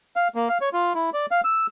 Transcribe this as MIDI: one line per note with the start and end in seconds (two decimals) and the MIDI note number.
0.16 0.28 77
0.35 0.49 58
0.49 0.58 77
0.61 0.69 73
0.73 0.93 65
0.95 1.10 64
1.14 1.26 74
1.31 1.41 77
1.44 1.67 88